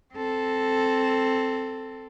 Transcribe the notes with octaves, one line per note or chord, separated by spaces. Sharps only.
C4 A4